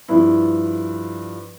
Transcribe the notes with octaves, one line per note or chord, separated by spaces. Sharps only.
G2 F3 E4